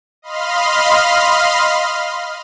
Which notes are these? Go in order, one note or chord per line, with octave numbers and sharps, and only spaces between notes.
D#5 F5 B5 C6 F6